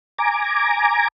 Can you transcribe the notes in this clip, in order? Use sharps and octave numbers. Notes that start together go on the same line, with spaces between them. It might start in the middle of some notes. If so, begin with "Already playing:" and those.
G#5 A#5 D6